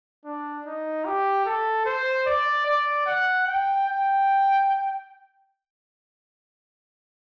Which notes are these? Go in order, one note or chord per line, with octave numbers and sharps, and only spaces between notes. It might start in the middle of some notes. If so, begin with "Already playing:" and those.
D4
D#4
G4
A4
C5
D5
D5
F#5
G5
G5